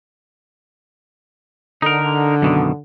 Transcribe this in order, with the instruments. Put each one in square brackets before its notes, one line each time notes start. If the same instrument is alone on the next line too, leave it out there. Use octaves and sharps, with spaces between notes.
[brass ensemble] D3 [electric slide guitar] D#4 A#4
[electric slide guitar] F#2 B2 D#3